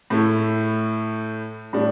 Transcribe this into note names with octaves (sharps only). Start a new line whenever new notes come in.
A2 A3 E4
A2 G3 D4